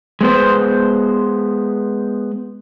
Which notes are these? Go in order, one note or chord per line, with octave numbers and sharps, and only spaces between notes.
G#3 B3 C5